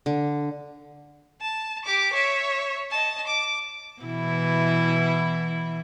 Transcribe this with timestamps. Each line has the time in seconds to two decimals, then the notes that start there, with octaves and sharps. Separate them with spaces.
0.06 D3
1.41 A5
1.85 G4 D6
2.14 C#5 E5
2.90 D#5 A5
3.27 D6
4.02 B2 E3 E4